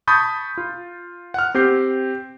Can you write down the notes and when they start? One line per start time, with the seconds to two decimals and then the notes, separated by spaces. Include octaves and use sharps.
0.07 A5 B5 C#6 D#6 G6 A6
0.57 F4
1.34 F#5 F6
1.54 C4 G4 G6 C7